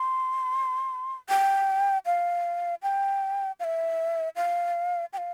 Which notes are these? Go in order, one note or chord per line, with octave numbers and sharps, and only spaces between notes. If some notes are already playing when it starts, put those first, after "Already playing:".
Already playing: C6
G5
F5
G5
F5
E5
F5
G5
F5